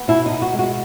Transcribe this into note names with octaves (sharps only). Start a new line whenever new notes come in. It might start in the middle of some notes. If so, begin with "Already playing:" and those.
Already playing: B3
B2 E4
B2 D#4
F#4
G#3
F#4